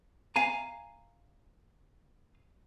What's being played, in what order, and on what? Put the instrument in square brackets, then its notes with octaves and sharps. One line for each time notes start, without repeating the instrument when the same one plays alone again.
[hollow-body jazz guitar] F5 G#5 A#5